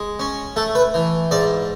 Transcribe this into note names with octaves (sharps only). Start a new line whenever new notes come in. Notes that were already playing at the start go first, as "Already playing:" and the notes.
Already playing: G#3
C#4
A3 A4
B4
E3
G#2 D5